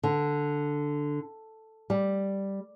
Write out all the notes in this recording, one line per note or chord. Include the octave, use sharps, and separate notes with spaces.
D3
G3